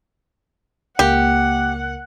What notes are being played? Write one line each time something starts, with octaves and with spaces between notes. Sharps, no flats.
C#2 A#3 G4 F#5